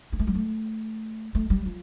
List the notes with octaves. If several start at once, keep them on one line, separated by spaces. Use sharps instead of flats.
A#3
A3
G3
A3
A3
G3
F3